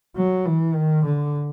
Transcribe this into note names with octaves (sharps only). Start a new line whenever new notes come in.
F#3
E3
D#3
D3